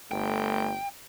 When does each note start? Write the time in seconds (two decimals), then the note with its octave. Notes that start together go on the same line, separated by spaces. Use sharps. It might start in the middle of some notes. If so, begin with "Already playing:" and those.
0.12 G1 A3 G5